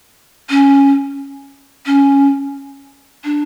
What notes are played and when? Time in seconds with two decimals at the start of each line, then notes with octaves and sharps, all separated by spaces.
0.50 C#4
1.86 C#4
3.24 D4